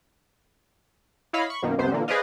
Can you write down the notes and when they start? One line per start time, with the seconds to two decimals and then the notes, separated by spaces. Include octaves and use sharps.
1.33 E4 C#5 D#5 F5 B5
1.46 B5 C#6
1.62 F#2 B2 D#3 A#3
1.78 C#2 F#2 C3 B3 C5
1.91 A#2 D3 E3 A#3
2.08 G#4 B4 C5 D5 D#5 F5